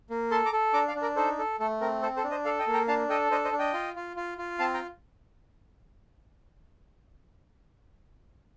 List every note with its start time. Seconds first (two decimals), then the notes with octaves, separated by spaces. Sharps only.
0.10 A#3
0.31 A4 A5 C6
0.45 A#5 D6
0.52 A4
0.73 D4 A#5 D6
0.88 D5 F5
0.95 D4
1.02 A#4 D5
1.16 D#4 A4 C5
1.39 A4
1.60 A3 A4
1.81 C4 A#4
2.02 A4 C5
2.17 A4 C5
2.24 D4
2.31 C5 D#5
2.45 A4 D5 F5
2.59 D#5 G5
2.67 A#3
2.73 G5 A#5
2.88 D4 F5 A5
3.09 A4 D#5 G5
3.31 D4 C5 D#5
3.45 C5 D#5
3.52 D4
3.59 D#5 G5
3.74 F4
3.96 F4
4.17 F4
4.38 F4
4.59 C4 F5 A5
4.74 G5 A#5